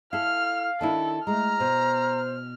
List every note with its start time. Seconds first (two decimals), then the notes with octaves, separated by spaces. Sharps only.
0.13 E4 A4 F5 F6
0.81 D#3 D4 E4 A4
1.27 G#3 A3 A#5 F6
1.60 B2 C5